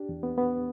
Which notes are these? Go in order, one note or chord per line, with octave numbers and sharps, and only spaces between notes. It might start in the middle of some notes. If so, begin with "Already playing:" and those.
Already playing: D4 G4
E2
B3
B3